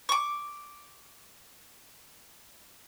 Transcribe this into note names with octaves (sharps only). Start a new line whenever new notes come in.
C#6 D6